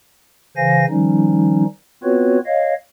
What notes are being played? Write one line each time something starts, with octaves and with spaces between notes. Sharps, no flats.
C#3 E3 C5 F5 G#5 A#6
D#3 F3 G3 C#4 D#4
B3 C4 F4 F#4 B4 C#5
C#5 D#5 F5